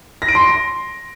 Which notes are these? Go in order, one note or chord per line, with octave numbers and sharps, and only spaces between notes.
A#6
D7
C6